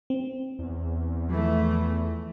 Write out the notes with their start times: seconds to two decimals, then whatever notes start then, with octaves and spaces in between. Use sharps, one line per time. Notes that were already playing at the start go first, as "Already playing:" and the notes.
0.10 C4
0.59 E2
1.30 E3 F3 A3